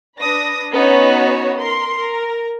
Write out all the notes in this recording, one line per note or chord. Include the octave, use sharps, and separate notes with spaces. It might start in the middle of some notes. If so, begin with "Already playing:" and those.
D4 B4 D#6 A#6
B3 C#4 D#4 F#4 C#5
A#4 C6
A#4